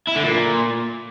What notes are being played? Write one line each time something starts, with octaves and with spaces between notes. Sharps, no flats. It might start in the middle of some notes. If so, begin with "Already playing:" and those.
E4
D3
A#2